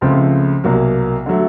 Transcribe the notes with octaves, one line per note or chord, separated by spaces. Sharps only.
C#2 C#3 F3 A3 C4
C2 B2 F#3 A#3
D3 F#3 A3